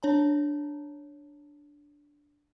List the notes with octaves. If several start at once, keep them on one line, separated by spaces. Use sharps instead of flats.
D4 C#5 A5 A#5